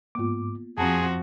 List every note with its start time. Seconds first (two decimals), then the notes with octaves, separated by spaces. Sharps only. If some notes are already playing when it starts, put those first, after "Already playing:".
0.15 G#2 A#3 B3 F4 D6
0.78 F2 F3 C4 F#4 G#4 A5 A#5